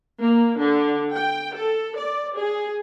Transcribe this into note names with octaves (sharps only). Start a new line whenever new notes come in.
A#3
D3
G5
A4
D5
G#4